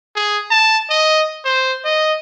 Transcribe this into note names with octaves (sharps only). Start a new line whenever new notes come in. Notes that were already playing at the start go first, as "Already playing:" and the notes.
G#4
A5
D#5
C5
D#5